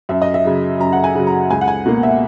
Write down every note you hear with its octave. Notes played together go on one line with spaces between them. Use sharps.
F#2 E5
D#5
E5
C#3 F#3
F#2 A#5
F#5
G#5
C#3 F#3
A#5
C#2 G#5
F#5
G#5
B2 A#3
E5